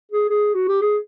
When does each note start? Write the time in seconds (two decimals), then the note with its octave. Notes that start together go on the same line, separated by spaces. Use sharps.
0.11 G#4
0.29 G#4
0.54 F#4
0.68 G4
0.81 G#4